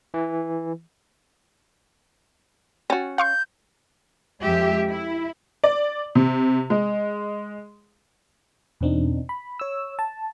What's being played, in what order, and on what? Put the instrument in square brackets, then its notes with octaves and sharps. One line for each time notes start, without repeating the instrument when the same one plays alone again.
[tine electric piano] E3
[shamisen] C#4 F#4 [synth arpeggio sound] G5 A6
[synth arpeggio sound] F5 C6 C#6 [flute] G6
[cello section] F2 G#3 G4 E5
E4
[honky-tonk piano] D5
C3
G#3
[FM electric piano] E2 B2 C4 D4 D#4
B5
C#5 E6
A5